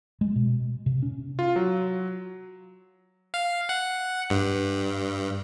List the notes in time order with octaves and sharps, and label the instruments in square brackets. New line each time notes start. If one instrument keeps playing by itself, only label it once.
[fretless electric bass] G#3
B2
C3
C#4
[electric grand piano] F4
F#3
[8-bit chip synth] F5
F#5
G2